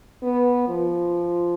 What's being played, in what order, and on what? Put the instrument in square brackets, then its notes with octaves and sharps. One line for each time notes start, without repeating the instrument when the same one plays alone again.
[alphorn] B3
F3